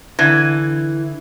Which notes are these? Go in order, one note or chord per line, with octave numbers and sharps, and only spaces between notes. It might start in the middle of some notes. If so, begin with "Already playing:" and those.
D3 E3 G#6